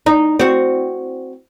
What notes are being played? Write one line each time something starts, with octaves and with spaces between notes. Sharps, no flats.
D#4
C4 F#4